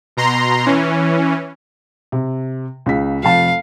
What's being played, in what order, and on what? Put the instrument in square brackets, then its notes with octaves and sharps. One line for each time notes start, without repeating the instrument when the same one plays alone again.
[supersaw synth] B2 A#5 C6
E3 C#4
[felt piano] C3
C#2 C#3 B6
[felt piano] F1 F2 A5 [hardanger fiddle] F5